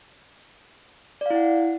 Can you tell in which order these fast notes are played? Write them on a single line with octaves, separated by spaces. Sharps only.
D5 F5 E4 F#5